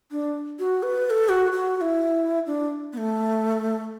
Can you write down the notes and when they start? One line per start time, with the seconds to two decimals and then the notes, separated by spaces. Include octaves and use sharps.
0.11 D4
0.59 F#4
0.83 B4
1.06 B4
1.10 A4
1.29 F#4
1.52 F#4
1.76 F#4
1.81 E4
2.46 D4
2.93 B3
2.98 A3